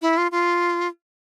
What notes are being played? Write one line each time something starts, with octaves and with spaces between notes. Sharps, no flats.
E4
F4
F4